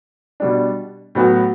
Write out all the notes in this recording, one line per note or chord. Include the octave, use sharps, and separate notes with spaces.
B2 G3 D4
A2 F#3 B3 F#4